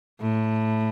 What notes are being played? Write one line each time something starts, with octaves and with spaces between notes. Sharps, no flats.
A2